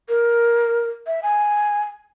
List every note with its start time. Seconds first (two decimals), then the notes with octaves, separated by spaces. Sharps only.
0.09 A#4
1.07 E5
1.23 G#5